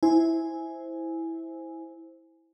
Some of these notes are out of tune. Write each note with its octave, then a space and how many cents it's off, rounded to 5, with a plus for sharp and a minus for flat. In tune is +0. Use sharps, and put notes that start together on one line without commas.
E4 -10 C5 +0 G#5 +0